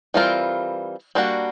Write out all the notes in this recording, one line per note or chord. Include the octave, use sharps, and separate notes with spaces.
E3 G3 C4 F4 A#4
G3 A#3 D4 F#4